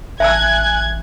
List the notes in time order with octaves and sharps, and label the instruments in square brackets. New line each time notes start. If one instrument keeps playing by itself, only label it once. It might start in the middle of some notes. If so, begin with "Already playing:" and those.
[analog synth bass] A1 [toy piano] E5 A5 E6 [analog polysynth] G#5 F#6 [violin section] G#6